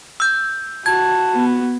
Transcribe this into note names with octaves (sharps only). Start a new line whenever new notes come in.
E6 G6
F#4 A5 G#6
B3